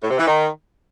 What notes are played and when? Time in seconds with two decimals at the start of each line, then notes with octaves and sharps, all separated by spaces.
0.02 A2
0.10 C3
0.19 E3
0.27 D#3